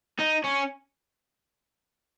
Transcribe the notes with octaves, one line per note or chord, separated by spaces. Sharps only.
D#4
C#4